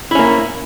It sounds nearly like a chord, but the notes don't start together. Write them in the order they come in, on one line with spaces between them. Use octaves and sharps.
E4 C#4 A#3